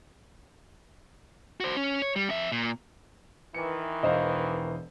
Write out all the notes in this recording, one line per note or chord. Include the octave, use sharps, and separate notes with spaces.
F#4 C5
C#4
C#5
G3
F2 E5
A#2
D#3 E3 C#7
E1 C5 D#5 F5